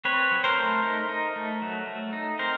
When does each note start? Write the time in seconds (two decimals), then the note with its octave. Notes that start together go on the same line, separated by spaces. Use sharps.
0.05 C4 B4 C#5
0.31 F#3
0.44 A#4 C5
0.57 A3
0.83 D#4
1.09 D#4
1.36 A3
1.62 F#3
1.87 A3
2.13 D#4
2.39 C4 A#4 C5